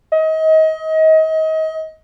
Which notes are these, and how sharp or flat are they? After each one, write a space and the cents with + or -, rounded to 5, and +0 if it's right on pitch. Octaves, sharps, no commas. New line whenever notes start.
D#5 +30